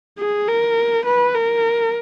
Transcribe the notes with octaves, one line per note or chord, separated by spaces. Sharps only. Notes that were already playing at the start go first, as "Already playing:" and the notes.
G#4
A#4
B4
A#4